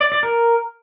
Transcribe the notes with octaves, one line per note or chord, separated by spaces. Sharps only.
D5
D5
A#4